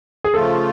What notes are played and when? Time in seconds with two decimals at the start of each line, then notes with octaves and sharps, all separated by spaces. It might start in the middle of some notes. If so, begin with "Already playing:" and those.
0.24 G#4
0.34 C#3 F3 A3 F4 A4